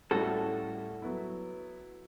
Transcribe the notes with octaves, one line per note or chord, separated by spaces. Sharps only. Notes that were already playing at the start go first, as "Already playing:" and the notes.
A2 G3 C#4 E4 F#4 A4
F#3 B3 E4